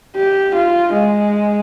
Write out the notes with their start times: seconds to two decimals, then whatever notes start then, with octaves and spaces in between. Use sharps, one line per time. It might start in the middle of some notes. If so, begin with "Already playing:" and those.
0.17 G4
0.55 F4
0.93 G#3